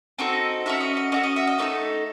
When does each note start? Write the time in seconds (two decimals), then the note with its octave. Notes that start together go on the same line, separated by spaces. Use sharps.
0.19 C4 D#4 F#4 A4
0.66 C#4 F#4 A4 E5
0.81 D#5
0.97 D#5
1.12 C#4 F#4 A4 D#5
1.23 D#5
1.36 E5
1.47 D#5
1.59 A3 D#4 A4 C#5